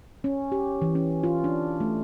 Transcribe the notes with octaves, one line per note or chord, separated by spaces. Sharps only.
C#4
G4
E3
C#4
F4
D4
A3